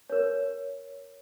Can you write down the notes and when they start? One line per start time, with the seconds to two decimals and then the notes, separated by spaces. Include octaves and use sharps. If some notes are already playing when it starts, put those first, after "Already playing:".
0.10 A#4 C#5